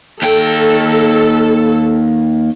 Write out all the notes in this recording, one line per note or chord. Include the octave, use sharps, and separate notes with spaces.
D#2 A4 G5